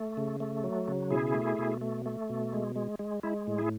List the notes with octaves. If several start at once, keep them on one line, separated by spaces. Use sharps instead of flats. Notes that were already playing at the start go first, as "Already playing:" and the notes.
Already playing: A3
C#3
A3
F#3
C#3
B2 E4 G#4
A3
B2
A3
A3
B2
G#3
G#3
G#3
G#3 E4
A2
E4 G#4